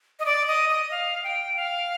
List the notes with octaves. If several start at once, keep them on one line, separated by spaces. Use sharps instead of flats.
D#5
D5
D#5
D#5
F5
G5
F5